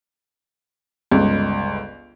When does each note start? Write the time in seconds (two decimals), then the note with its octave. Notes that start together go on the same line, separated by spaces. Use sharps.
1.11 G1 C#2